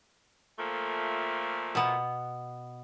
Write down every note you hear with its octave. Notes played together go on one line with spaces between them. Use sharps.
A#2 F3 A3
B2 B3